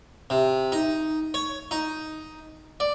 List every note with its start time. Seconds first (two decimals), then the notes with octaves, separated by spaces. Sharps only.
0.30 C3
0.72 D#4
1.34 C#5
1.71 D#4
2.80 D5